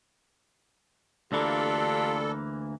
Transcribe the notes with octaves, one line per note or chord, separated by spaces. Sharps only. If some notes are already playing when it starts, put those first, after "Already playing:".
D2 E3 A#3 D4 F4 G4 A4 D5